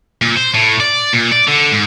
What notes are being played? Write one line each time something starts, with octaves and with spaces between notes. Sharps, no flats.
A#2
C5
A2
D5
A#2
D5
D3
G#2